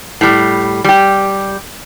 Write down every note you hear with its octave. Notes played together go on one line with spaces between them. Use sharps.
A2 G3
G3 G4